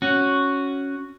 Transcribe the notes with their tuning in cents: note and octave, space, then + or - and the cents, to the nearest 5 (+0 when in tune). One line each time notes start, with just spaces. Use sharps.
C#4 +0 F#4 +0